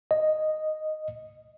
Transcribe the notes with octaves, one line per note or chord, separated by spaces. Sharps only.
D#5